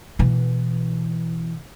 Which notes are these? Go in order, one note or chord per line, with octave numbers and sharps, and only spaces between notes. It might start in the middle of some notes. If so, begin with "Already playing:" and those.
B2 E3